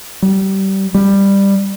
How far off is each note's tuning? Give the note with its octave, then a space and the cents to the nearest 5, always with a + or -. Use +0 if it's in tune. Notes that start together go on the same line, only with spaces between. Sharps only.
G3 -25
G3 +10